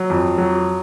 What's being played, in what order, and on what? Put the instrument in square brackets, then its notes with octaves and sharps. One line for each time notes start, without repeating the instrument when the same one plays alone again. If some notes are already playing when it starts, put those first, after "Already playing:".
Already playing: [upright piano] F#3
F2
F#3